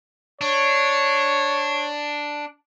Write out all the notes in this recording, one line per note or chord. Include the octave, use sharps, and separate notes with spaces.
D4 C#5